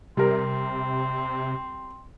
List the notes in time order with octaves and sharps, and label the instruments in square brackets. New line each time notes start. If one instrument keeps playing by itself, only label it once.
[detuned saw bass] C3 [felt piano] G3 A#4 [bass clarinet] C4